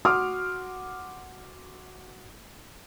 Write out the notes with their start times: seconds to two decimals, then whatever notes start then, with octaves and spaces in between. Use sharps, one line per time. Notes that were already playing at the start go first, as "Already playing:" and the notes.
0.05 F#4 F#5 C6 D6 D#6 F6